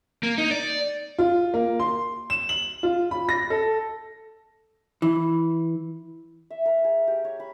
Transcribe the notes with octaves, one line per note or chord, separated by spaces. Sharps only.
A#3
D#4
D5
F4
A#3
C6
E7
F#7
F4
B5
A#6
A4
E3
E5
A#4
G#4
G4
C#5
B5